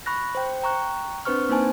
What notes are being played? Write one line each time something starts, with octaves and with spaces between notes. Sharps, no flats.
B5 C#6 F#6 A#6
C5 G5
G5 A#5 C#6 F#6
C4 D4 B4 C5 C#6 F6
A#3 C4 D#4 C5 G#5 A5